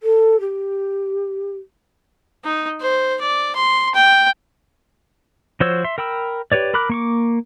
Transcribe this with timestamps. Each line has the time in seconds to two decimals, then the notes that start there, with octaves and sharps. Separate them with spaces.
0.03 A4
0.40 G4
2.45 D#4
2.81 C5
3.21 D5
3.55 C6
3.95 G5
5.60 F3 F#4 C5 C#5 E6
5.84 E5 C6
5.98 A#4 G5 B5 E6
6.52 G4 B4 C#5 D5
6.74 A#4 B5 D6 F#6
6.90 A#3 C#6 D6